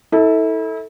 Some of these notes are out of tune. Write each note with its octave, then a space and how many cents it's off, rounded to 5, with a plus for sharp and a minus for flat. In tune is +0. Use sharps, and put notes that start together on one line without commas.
E4 -35 A4 +5